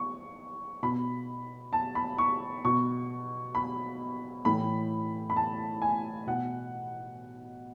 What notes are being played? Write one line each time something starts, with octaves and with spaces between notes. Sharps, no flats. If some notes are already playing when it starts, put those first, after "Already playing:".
Already playing: C#6
B2 B5
A5
B5
C#6
B2 C#6
B5
A2 E3 B5
B5
A5
G#5
B2 F#5